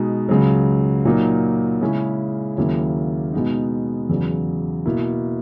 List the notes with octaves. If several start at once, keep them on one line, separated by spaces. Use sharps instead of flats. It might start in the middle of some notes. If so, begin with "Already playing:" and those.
Already playing: B2 G#3 D#4
C#2 C#3 F#3
A#2 F#3 A#3 D#4
C#3 G#3 C#4 E4
D#2 C#3 F#3 A#3 E4
B2 G#3 B3 D#4
E2 C#3 F#3
B2 A#3 E4